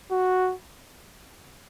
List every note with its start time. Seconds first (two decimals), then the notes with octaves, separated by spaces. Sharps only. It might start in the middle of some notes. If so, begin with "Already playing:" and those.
0.11 F#4